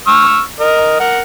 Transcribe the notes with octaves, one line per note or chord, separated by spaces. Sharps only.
C#6 E6 F6
A#4 D#5
A#4 F#5